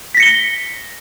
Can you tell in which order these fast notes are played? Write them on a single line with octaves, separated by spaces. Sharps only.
B6 A#6 C#7 G7